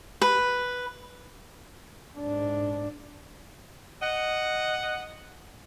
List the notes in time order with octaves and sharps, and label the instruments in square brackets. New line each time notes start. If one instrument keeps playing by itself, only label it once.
[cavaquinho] B4
[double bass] G#2 D4
[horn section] D#5 F#5